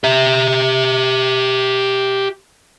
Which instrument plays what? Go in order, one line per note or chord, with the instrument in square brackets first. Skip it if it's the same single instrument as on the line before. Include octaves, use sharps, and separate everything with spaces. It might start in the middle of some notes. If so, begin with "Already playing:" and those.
[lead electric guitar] G4 E5